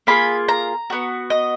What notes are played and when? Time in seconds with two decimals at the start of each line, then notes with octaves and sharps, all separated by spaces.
0.07 A#3 F4 G#4 B5
0.48 A#5
0.90 B3 F#4
1.30 D#5